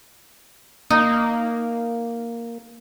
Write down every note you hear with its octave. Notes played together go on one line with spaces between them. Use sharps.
A#3 D#4